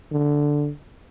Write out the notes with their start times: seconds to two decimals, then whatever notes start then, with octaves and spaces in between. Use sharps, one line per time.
0.11 D3